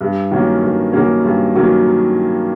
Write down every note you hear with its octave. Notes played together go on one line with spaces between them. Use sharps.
G2
D#3 F#3 A#3 C#4
G2
D#3 F#3 A#3 C#4
G2
D#3 F#3 A#3 C#4